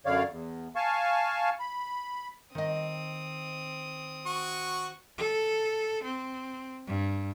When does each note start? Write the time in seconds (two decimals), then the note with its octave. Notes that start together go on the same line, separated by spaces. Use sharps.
0.06 F#2 D3 C#5 D5 F5
0.31 E2
0.76 F5 G#5 A5 C#6
1.60 B5
2.55 D#3 C4 D#5 D#6
4.26 F#4 C#6
5.18 A4
6.03 C4
6.87 G2